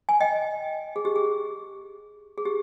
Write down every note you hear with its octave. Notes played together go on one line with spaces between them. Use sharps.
G#5
D#5 G5
G#4
G4
G#4
G#4
G4